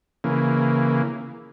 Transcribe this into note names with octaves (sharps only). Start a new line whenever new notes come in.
C#3 E3 A#3